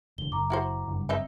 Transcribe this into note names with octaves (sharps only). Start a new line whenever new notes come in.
E1 D3 G7
F#1 A#5 D6
E4 F#4 C5
F#1 G2
C4 D#4 E5